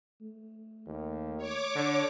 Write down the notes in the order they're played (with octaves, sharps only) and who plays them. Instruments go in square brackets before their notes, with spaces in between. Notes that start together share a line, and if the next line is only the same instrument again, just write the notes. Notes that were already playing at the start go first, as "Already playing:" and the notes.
[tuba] A3
[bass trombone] D#2
[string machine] C#5 D6
[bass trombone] D3